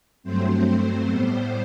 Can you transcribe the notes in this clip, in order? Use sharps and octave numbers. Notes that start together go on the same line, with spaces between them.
G2 F#3 A3 C4 C5
A2 G3 B3